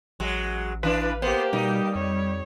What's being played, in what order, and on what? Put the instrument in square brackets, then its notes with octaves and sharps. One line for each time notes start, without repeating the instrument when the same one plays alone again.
[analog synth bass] A1 [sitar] F#3 G#3
[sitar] E3 D4 [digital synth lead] B4 [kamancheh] F5
[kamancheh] A#3 G4 [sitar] B3 [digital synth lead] C5
[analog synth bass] B2 [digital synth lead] G3 [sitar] D#4
[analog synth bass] F2 [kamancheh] C#5